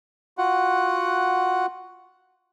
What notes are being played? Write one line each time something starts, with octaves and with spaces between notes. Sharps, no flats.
F4 F#4 F#5